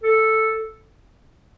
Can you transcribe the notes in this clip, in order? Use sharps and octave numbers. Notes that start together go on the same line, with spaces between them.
A4